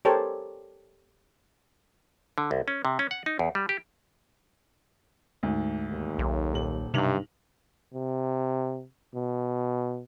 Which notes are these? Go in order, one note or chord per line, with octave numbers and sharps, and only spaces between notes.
G4 A4 A#4 C5 C#5 A5
D3
C2
C#4
C3
C#4
F#5
D#4
E2
G3
G4
D2 G#2
D#2
B1
D#1 F#7
B1 G2 C3 F7 F#7
C3
B2